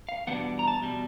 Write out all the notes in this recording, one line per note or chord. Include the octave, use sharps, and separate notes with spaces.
F5
E2 B2 G3 B3 D4 F#5
A#5
A5
E2 B2 G3